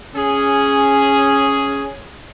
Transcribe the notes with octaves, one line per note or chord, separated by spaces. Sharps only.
C#4 G#4